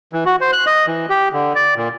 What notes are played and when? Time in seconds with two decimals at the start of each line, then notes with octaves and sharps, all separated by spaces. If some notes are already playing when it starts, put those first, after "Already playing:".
0.13 E3
0.26 F#4
0.41 C5
0.53 F#6
0.66 D#5
0.87 E3
1.09 G4
1.33 D3
1.55 D5
1.76 A#2